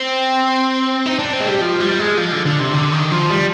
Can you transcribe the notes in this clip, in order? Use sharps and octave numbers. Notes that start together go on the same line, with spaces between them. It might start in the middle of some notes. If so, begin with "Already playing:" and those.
Already playing: C4
D#4
D4
C4
G#3
G3
F3
G3
G#3
F3
D3
D3
C3
D3
D#3
F3
G3